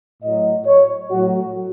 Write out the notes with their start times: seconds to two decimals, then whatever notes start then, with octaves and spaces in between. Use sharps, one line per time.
0.22 A2 F#3 D#5
0.66 C#5
1.10 A2 F#3 F#4